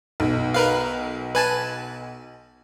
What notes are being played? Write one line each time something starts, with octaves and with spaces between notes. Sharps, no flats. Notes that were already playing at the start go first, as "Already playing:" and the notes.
B1
A#4 B4 F5
B4 G#5 A5